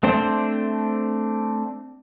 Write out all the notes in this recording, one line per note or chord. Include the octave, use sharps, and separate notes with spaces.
A3 C4 D4 C5